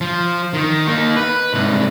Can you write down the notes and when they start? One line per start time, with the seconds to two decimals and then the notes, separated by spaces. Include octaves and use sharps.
0.01 F3
0.53 D#3
0.87 A#3 D#4
1.16 B4
1.54 C2 G#2